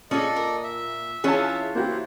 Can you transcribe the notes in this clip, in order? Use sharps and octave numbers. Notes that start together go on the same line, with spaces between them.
A#2 C#4 G#4 A4 D5 D#5
A#4
E5
E3 C#4 F4 G#4 C#5 A5
A#3 E4 F#4 G4 C5